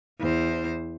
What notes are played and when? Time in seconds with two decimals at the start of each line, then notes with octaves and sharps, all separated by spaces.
0.19 E2 C5